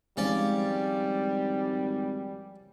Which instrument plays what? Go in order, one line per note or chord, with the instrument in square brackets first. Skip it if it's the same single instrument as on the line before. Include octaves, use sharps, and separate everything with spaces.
[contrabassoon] G#1 [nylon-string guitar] F3 G#3 F5 [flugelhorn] G3 [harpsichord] C#4 D5